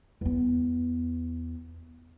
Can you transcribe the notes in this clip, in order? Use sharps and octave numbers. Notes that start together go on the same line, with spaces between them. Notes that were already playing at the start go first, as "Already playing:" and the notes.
E2 B3